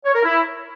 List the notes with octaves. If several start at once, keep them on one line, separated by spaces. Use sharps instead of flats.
C#5
A#4
E4